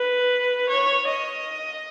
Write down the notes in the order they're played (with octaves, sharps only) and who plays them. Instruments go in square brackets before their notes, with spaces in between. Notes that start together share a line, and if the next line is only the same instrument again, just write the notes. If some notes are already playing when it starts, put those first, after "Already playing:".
Already playing: [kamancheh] B4
C#5
D#5